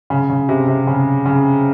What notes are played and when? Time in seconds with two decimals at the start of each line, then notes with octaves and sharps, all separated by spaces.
0.10 C#3
0.29 C#3
0.49 C3
0.68 C3
0.87 C#3
1.26 C#3